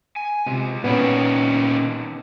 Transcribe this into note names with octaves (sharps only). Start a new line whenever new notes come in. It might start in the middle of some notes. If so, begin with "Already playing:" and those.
G#5
C3 G#3 F4
A#2 D#3 B3 C#4 D4 C#5